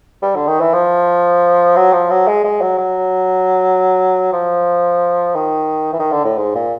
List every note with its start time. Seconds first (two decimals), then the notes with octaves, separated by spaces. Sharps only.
0.22 G3
0.35 D3
0.47 D#3
0.60 E3
0.73 F3
1.76 F#3
1.93 F3
2.10 F#3
2.27 G#3
2.44 G#3
2.61 F#3
2.78 F#3
4.33 F3
5.35 D#3
5.93 E3
5.99 D#3
6.12 D3
6.25 A2
6.37 G#2
6.55 A#2